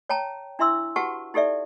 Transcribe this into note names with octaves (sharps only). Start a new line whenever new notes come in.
C#5 G5 A5 A#5
D4 E4 E5 C6 E6
F#4 G4 B4 F#5 A5 C#6
D#4 G4 A4 D5 E5